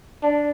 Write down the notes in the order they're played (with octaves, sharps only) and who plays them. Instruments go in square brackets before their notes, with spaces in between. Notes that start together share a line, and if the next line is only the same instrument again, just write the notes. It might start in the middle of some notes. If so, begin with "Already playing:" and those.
[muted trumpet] D4